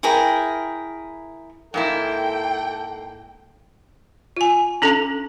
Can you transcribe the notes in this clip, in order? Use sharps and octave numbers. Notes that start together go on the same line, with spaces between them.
E4 G#4 A#4 G5
G#2 A#3 E4 A4 G5
F4 G#5
C#4 D4 A4